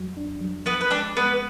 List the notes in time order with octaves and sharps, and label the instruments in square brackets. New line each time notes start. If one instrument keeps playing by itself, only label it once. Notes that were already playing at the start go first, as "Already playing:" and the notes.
Already playing: [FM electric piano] F2 F#3 F#4
D4
F#3
[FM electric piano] F3 [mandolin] B3 B4
[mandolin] B4
[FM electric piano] G#3 [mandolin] D4 D5
[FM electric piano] G#3 [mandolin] B3 B4